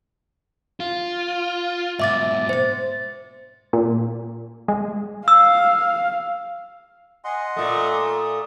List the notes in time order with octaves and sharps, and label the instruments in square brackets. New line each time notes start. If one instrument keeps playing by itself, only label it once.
[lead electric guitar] F4
[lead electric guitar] G#2 B2 [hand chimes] E5 D6 A6
[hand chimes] C5 A6
[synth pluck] A#2
G#3
[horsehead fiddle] F5 [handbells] E6
[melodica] D#5 F#5 C6 [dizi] G#5
[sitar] A#2 A3 [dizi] D#6